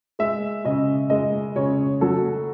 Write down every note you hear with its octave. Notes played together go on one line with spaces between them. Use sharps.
G#3 E5
C#3 D#5
G#3 D#5
C#3 C#5
F#3 A4